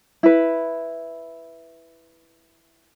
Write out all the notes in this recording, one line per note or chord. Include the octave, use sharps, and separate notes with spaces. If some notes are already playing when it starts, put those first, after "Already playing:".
E4 B4